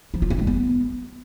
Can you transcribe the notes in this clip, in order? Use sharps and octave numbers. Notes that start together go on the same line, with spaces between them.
F3
F4
C4
G#3
B3